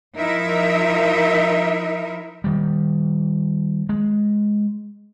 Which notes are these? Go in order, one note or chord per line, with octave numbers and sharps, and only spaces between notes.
F3 D#4 E4 A#4 E5
D#3 G3
G#3